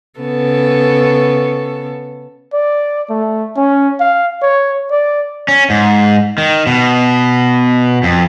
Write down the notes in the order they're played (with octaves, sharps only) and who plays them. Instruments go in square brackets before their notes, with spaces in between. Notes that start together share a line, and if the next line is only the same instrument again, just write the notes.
[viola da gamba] C#3 B3 A4
[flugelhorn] D5
A3
C#4
F5
C#5
D5
[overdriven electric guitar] C#4
G#2
D#3
B2
F2